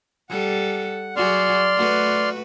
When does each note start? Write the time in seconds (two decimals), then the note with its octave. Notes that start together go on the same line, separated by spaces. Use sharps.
0.29 G3 A4 F#5
1.16 F#3 F#4 G#4 D5 C6 F6
1.75 A3 F#4 B4